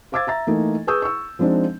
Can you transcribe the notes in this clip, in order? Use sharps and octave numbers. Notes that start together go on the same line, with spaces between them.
C5 F5 D6 E6 G#6 A6
E5 A#5 A6
E3 A3 A#3 D#4
G#4 B4 C#6 D#6 E6 G6
C#6 E6
F3 G#3 C4 D4 D#4